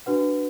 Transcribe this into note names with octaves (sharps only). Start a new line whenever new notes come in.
D4 F#4 B4 F#5